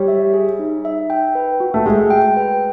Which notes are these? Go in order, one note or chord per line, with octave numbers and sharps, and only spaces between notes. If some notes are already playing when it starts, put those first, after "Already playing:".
Already playing: G3 C#5
E5
G#4
D#4
E5
G5
B4
F#4
A3
G#3 E5
G5
B4